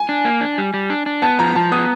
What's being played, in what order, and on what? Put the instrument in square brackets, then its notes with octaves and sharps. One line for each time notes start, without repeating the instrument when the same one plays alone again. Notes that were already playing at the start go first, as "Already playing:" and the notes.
Already playing: [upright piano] G#5
[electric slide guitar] D4
A#3
D4
G3
G3
D4
D4
[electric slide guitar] B3 [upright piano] A5
[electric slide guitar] F3 [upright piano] A#5
[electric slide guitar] F3 [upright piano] A5
[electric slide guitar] B3 [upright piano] D#6